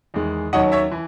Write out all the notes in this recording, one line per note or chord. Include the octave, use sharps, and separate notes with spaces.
E2 D#3 G#3
D#2 D#3 F#3 C#4 D#5 F#5
C#5 E5
E3